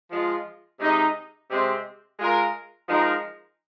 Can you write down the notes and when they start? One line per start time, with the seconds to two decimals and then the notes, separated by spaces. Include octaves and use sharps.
0.11 F3 G#3 F4
0.80 C3 G#3 D#4
1.50 C3 G#3 C4
2.19 G#3 F4 A#4
2.89 F3 G#3 D#4 A#4